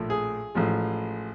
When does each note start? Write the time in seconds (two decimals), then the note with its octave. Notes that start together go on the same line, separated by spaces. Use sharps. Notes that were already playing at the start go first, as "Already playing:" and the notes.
Already playing: A#1 A2 F3 A3
0.10 G#4
0.55 A1 A2 F3 G#3